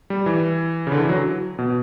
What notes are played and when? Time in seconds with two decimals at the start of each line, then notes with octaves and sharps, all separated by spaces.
0.10 G3
0.26 E3
0.87 C#3
0.92 D3
1.00 E3
1.09 F#3
1.59 B2